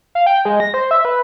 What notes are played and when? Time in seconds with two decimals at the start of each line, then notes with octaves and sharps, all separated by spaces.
0.15 F5
0.26 G5
0.45 G#3
0.60 A#6
0.74 C5
0.91 E5
1.05 B4